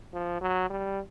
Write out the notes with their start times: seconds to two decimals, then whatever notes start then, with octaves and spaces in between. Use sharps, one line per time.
0.14 F3
0.41 F#3
0.70 G3